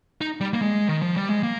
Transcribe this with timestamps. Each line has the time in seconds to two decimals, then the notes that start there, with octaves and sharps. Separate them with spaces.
0.21 D#4
0.41 G3
0.54 A#3
0.61 G#3
0.88 D#3
1.02 F3
1.16 G3
1.30 G#3
1.43 A#3